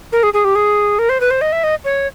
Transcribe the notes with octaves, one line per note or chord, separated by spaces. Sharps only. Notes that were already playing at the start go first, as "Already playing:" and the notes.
A#4
G#4
G#4
G4
G#4
A#4
C5
B4
C5
D#5
E5
D#5
C#5